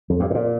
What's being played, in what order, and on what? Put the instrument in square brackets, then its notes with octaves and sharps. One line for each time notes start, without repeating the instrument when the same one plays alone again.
[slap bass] F2
G2
A2
A#2